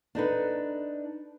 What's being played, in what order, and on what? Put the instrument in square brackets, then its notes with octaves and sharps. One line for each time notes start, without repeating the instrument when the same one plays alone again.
[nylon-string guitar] D4 D#4 A4 B4